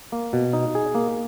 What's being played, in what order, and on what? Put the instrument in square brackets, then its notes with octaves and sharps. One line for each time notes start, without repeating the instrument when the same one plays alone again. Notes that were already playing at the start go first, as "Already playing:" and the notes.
[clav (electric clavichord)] A#3
B2
D#4
G#4
A#3